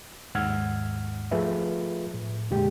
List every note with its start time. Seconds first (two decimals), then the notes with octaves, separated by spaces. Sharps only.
0.35 D#2 G#2 F#5 E6 F6 G#6
1.31 F3 A3 F4 G#4 B4 E5
2.14 A2
2.50 F2 A#2 D3 G#3 G4